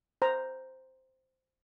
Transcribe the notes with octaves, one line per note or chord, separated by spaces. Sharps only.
C5 A#5